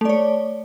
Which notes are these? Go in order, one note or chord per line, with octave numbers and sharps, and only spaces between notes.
A3 C#5 D5